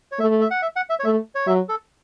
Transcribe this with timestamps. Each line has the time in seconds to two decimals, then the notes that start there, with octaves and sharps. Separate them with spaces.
0.12 C#5
0.19 A3 E5
0.41 E5
0.51 F#5
0.62 E5
0.76 F#5
0.90 E5
0.99 C#5
1.04 A3 E5
1.35 C#5
1.47 F#3 E5
1.69 A4